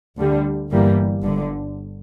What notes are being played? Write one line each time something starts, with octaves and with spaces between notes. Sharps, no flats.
D2 D3 G3
G1 G2 E3 G3 A#3
G1 G2 D3